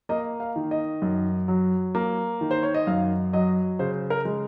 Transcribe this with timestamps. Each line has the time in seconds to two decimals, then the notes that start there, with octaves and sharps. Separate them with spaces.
0.09 A#3 D#5
0.40 F5
0.56 D#3
0.71 D#5
1.02 F#2
1.48 F#3
1.95 A#3
2.41 D#3
2.51 C5
2.63 C#5
2.74 D#5
2.87 F#2 F5
3.33 F#3 D#5
3.79 C#3 C5
4.10 A#4
4.25 G#3